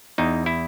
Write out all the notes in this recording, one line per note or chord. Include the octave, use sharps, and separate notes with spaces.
E2 D#4
E4